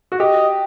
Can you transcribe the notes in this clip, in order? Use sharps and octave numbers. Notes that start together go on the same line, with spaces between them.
F#4
G4 D#5